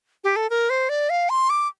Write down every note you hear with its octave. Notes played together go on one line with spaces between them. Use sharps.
G4
A4
A#4
C5
D5
F5
C6
D6